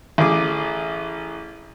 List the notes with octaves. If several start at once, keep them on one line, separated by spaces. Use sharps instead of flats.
A1 G#4 D6